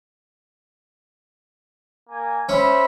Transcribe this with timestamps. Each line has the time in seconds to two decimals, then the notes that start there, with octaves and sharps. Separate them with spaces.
2.10 A#3 G#5
2.49 C#4 C5 E5 B5